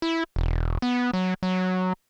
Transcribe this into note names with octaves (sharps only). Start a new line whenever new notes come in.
E4
E1
B3
F#3
F#3